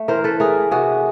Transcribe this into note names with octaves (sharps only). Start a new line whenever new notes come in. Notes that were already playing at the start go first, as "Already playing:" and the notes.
Already playing: A3
E3 A#4 C5
A4 B4
A3 G#4 A#4
C3 F#4 G#4